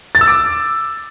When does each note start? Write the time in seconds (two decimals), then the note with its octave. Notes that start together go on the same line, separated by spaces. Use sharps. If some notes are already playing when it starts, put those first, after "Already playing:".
0.15 A6
0.21 E6
0.27 D6